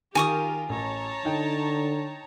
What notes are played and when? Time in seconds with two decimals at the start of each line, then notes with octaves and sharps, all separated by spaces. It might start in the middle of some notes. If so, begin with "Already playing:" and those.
0.15 D#3 F4 G4 A#4 G#5 C#6 D#6
0.69 A1 C#5 A5 A#5
1.25 D3 D#4 G5